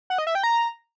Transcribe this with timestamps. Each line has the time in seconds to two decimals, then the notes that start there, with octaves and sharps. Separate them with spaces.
0.10 F#5
0.18 D#5
0.27 E5
0.35 G5
0.43 A#5